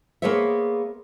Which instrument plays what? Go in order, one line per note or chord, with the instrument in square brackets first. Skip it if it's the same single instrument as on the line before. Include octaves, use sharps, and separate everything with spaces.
[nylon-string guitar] A#3 B3 G#4 C5 C#5 E5